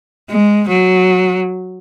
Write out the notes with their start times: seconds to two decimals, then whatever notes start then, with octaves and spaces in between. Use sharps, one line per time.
0.29 G#3
0.68 F#3